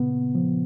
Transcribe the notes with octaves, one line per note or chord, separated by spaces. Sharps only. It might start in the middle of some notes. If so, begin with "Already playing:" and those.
Already playing: A#2 C#3 B3
F3